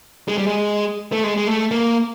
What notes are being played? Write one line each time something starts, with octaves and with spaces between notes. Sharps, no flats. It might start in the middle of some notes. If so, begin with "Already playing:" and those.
G#3
G3
G#3
A3
G#3
G#3
A3
A#3